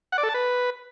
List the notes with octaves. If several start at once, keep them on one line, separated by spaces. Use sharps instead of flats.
F#5
D5
A4
A5
B4